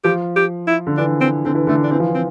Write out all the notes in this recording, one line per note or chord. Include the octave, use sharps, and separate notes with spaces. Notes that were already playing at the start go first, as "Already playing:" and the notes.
F3 G4
G4
E4
D3
E3 D4
C4
D3 C4
E3
D3 A3
D4
E3 C4
F3
E3
C4